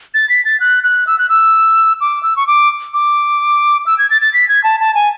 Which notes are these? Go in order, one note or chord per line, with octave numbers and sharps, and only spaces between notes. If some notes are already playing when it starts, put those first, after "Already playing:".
A6
B6
A6
F#6
F#6
E6
F#6
E6
D6
E6
C#6
D6
D6
E6
G#6
A6
A6
B6
G#6
A5
A5
G#5